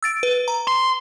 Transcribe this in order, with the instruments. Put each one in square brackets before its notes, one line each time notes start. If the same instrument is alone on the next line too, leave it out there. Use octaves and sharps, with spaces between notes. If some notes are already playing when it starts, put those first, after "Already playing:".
[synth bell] E6 A6 D7
B4
A#5
[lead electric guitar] C6